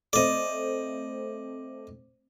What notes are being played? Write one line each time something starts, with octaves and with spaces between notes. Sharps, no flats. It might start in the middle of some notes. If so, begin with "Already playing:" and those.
A3 C4 C5 D5 D#5